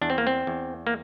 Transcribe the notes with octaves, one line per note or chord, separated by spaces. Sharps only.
E2 D4
C4
A#3
C4
E2
A#3